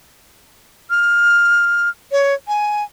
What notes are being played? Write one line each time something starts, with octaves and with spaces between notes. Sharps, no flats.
F6
C#5
G#5